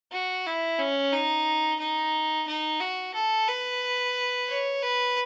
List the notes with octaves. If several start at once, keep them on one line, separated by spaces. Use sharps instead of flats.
F#4
E4
C#4
D#4
D#4
D#4
F#4
A4
B4
C#5
B4